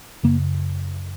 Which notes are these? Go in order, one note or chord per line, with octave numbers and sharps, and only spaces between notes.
F#2 C#3 A#3